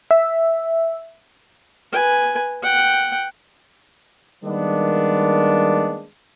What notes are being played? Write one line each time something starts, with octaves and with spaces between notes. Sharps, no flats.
E5
B4 G#5
F#5 G5
D#3 G3 G#3 A#3 B3 D4